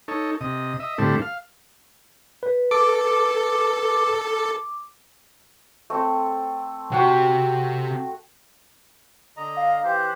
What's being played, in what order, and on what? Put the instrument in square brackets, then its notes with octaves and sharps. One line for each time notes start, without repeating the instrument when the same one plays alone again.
[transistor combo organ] D#4 A4 C#5
C3 D#5
D#5 E5
A2 D3 G3 C4 E4 A4
F5
[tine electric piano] B4
[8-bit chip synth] A4 [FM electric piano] D6
[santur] A3 C4
[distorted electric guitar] C3 [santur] F#4 F#5 G5
[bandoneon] D3 D#5 A#5
[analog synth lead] F5
[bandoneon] E3 G4 C5
[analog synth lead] F#6